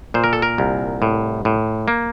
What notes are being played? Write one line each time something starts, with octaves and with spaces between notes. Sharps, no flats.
A#2 C5
A#4
A4
A#4
C2
A2
A2
A#3